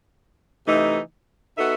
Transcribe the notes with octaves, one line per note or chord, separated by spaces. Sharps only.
C3 E3 A3 D#4
B3 D#4 F#4 A4 E5